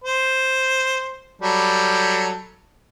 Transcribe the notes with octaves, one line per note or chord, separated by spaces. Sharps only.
C5
F#3 G3 A4